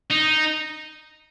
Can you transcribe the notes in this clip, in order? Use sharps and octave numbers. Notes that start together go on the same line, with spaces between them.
D#4